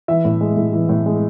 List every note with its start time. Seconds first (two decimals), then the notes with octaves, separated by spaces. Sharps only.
0.08 E3 E5
0.25 A2
0.41 G#3
0.57 A2
0.73 E3
0.89 A2
1.06 G#3